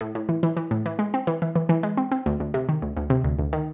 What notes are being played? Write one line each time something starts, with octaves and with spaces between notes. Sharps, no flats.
A2
A2
E3
E3
E3
A2
E3
G#3
C4
E3
E3
E3
E3
G#3
C4
C4
D2
D2
C3
D#3
D2
D2
C3
D2
D2
D#3